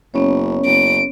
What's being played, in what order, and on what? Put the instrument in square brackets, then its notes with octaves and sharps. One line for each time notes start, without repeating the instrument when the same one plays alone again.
[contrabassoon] F#1 [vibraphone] B3 C#4 C#5
[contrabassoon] F#1 [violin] D7